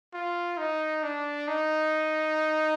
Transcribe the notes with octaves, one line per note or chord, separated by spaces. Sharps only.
F4
D#4
D4
D#4